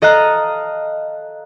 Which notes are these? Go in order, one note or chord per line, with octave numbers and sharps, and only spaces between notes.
A4 D#5 F5 A#5 F#6